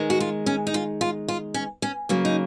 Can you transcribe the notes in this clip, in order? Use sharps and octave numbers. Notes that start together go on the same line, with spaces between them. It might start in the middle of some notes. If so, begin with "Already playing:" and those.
Already playing: D#3 G#3
F#4
F4
C#4
D#4
F4
F4
F4
C#4
C#4
C#3 F#3 A#3
D#4